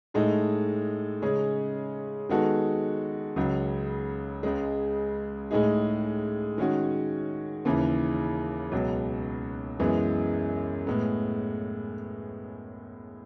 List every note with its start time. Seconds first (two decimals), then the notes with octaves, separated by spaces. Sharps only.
0.14 A2 G#3 D#4 A4
1.22 C#3 G#3 C#4 G#4
2.29 D#3 G#3 B3 F#4 A4
3.36 C#2 C#3 F#3
4.43 C#2 C#3 G#3
5.51 A2 G#3 D#4 G#4
6.58 D#3 G#3 C#4 F#4
7.65 D#2 C#3 E3
8.72 C#2 B2 F#3
9.80 F#2 E3 G#3 B3
10.87 A2 G#3 B3